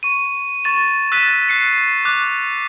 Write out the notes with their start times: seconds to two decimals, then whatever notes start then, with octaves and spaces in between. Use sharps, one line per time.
0.03 C#6 D#7
0.64 C#6 A6 E7
1.12 E6 F#6 A6 B6 D#7 E7
1.49 F#6 C7 C#7 E7
2.05 D6 F#6